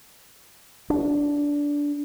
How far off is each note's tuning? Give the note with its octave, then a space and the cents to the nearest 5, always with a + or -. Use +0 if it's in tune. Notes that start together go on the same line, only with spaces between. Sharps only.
D4 -15